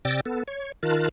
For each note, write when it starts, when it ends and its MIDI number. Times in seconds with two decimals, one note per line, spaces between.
0.05 0.21 48
0.05 0.21 74
0.05 0.21 79
0.05 0.21 88
0.05 0.21 93
0.05 0.21 94
0.26 0.43 59
0.26 0.43 69
0.48 0.72 73
0.83 1.09 51
0.83 1.09 65
0.83 1.09 70
0.83 1.09 81
0.83 1.09 90